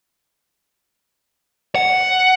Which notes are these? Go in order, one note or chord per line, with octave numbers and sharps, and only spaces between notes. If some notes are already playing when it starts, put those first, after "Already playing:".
F#5